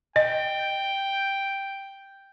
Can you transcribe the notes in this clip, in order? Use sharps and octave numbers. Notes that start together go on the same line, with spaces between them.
D#5 G5